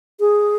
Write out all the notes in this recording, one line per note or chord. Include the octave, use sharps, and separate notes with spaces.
G#4